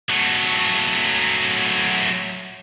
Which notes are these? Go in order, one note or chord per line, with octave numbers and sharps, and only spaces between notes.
F#3 A3